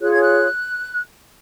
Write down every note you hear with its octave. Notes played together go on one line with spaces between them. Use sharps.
F4 G#4 C#5 F#6
G#6
F#6